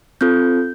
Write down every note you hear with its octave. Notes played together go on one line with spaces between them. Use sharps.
C4 F4 A4 G6